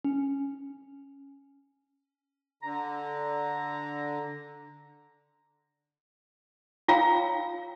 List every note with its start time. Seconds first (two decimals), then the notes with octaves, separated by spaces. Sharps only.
0.05 C#4
2.63 D3 A#5
6.88 F4 C#5 F5 G5 A#5 E6